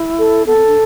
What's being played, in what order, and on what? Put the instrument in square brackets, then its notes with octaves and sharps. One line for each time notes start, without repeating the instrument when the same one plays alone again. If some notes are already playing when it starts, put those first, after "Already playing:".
Already playing: [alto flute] E4
[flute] A4
[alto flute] B3 [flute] A4
[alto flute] C4
D4